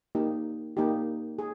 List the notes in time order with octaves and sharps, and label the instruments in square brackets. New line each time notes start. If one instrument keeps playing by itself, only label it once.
[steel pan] A#3 D#4 G4
A#3 D#4 G4
G#4